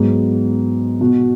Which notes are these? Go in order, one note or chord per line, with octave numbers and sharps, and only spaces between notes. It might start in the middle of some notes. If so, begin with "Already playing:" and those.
Already playing: G#2 F#3 B3
B2 B3 F#4